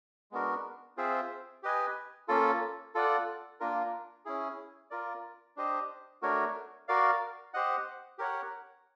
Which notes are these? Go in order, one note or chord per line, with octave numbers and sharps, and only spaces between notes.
G#3 B3 D4 F#4 A#4
C4 F4 G#4 C5 E5
G4 B4 D#5 G#5
A#3 C#4 F4 A4
F4 A4 D5 F#5
A#3 D4 F4 A#4
C#4 E4 G#4
F4 A#4 D5
D4 G4 C5 D#5
A3 D4 F#4 A#4 C#5
F#4 A#4 D5 F5
G4 C5 D#5 F#5
G4 A#4 C#5 F#5